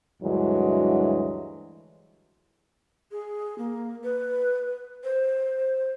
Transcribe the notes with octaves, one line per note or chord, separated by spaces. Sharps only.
D2 G2 E3 F#3 G#3
G#4
A#3
B4
C5